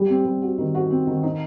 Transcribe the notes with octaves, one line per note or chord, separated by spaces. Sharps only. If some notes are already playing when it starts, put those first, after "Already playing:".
Already playing: G3
C4
G3
F#4
D#3
F#4
C4
D#3
D#4